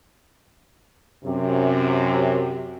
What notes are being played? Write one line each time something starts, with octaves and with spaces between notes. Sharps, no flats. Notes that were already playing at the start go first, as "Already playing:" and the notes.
F#2 C3